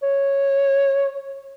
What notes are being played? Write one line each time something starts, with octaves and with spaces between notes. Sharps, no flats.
C#5